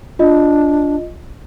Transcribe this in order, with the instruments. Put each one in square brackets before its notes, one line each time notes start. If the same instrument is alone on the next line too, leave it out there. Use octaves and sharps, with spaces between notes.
[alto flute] D4 [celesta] F4 D#5